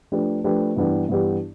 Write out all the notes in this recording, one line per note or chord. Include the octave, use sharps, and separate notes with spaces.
F3 A3 D4 G4 B4
F3 A3 D4 G4 B4
G2 E3 B3 D4 G4
G2 E3 B3 D4 G4